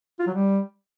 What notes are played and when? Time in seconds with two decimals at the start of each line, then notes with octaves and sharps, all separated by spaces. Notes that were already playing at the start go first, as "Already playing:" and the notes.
0.19 F4
0.27 F#3
0.34 G3